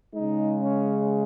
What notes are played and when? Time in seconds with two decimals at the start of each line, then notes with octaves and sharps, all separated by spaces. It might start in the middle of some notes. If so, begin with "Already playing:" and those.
0.15 G#3 D#4
0.20 C#3
0.59 C#4